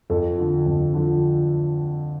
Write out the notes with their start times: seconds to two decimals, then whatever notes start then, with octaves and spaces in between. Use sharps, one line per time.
0.10 F2 A4
0.38 D3 F3
0.66 F2
0.94 D3 F3